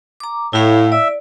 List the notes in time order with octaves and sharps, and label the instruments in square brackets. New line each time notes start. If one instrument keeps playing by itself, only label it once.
[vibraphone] A#5 D6
[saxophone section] A2 [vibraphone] E4 F5
[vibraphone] D5 [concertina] E5